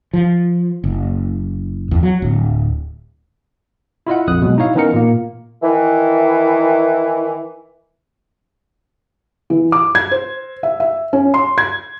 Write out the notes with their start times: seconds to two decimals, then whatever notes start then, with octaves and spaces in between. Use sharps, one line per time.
0.13 F3
0.84 F#1
1.91 E2
2.03 F#3
2.22 D1
4.07 E4 F4 D#5 F#5
4.27 A#1 F2 D#6 F#6
4.42 B2 F#3 G#3
4.58 D#4 E4 C#5 F5
4.75 E3 B3 C#4 D#4 A#4 C#7
4.94 A#2 A#3
5.62 D#3 E3
9.50 E3
9.72 D6
9.95 G#6
10.11 C5
10.63 E5
10.80 E5
11.13 C#4
11.34 C6
11.58 G#6